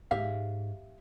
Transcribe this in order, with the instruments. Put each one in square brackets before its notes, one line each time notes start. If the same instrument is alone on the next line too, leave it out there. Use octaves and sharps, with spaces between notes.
[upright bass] G#2 [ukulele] G4 E5 F5